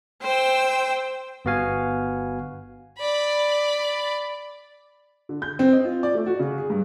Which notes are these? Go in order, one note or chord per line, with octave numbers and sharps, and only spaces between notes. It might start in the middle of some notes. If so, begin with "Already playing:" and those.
C5 G5 E6
G1 B3 F#4 F5 G#5
D5 B5
D3
G6
C4
D#5
F4
D5
A3
F#4
C#3
G#4
G2